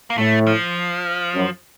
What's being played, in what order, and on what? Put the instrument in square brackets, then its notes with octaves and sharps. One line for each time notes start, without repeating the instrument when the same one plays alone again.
[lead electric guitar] A#3
[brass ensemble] A2 [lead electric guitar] A3
[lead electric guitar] F3
[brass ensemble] F#2